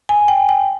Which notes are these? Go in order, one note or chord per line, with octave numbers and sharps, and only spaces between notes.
G#5
G5
G5